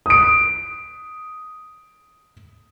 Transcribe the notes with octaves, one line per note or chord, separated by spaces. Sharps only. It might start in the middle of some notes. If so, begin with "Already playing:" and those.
D#6 D7